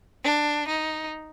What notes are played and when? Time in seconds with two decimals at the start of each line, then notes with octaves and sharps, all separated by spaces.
0.24 D4
0.68 D#4